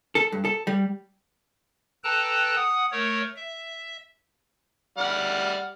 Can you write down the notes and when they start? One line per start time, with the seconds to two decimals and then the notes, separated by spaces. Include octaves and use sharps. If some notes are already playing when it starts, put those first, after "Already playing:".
0.15 A4
0.32 G2
0.45 A4
0.67 G3
2.04 A4 B4 G5 A5 A#5 F#6
2.56 F#5 D#6
2.91 A3 A#4 C#5
3.36 E5
4.98 G3 F#5 F6